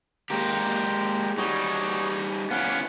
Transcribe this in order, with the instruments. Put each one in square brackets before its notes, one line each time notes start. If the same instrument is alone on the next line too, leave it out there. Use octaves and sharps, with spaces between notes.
[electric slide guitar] G#3 A#3 G4 [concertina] G5 A#5
[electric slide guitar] G3 D#4 [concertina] F#4 G#4 C#5
[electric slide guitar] B3 C#4 E4 [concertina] F5 F#5